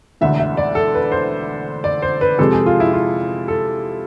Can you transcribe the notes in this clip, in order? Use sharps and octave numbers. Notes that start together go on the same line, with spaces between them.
E1 D2 D3 E5
E5
D5
A4
B4
C5
D5
C5
B4
F2 C3 G#3 A4
G#4
F4
E4
F4
A4